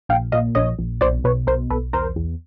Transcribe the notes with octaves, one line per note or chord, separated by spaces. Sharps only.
A#1 F5 G5
A#2 D#5 F5
A#1 C#5 D#5
A#1
B1 C5 D5
B2 B4 C#5
B1 A#4 C5
B1 A4 B4
E2 A#4 C5
E2